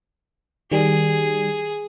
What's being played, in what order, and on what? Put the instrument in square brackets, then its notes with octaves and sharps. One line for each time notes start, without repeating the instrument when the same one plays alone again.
[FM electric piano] D#3 G3 [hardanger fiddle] G#4